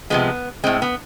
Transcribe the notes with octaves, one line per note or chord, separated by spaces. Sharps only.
C3 F3 G#3 B3
A2 G#3 C4
B3